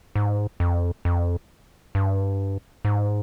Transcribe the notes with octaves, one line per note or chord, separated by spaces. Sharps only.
G#2
F2
F2
G2
G#2